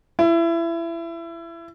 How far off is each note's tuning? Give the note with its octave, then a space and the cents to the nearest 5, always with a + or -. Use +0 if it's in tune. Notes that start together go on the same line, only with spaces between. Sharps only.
E4 +25